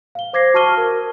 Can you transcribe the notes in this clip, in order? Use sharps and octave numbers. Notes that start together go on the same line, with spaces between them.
F5 G7
C5 D6 G#6 A#6 C7
F#4 A5 C#6 F6 D#7 G7
A#4